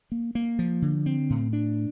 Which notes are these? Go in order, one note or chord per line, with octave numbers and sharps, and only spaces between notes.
A#3
A#3
F3
D3
C4
A2
D4